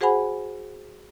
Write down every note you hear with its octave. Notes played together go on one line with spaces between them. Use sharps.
F#4 G#4 C5 F#5 G#5 B5